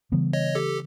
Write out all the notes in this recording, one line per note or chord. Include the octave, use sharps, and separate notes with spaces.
C#3 E3 G3 B3
C#5 D#5
G4 A4